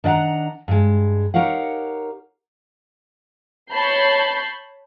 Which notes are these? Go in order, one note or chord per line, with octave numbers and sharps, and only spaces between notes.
D#3 D4 D5 F#5 A#5
G2 G#3
D#4 G4 A#4 C#5 F5 F#5
C#5 A5 B5 G6 C7